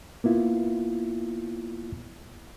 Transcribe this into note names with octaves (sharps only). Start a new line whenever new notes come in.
A#3 B3 E4 F4